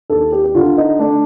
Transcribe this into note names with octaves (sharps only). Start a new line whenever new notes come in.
D#2 A4
G4
G4
D3 F4
D#4
A3 D4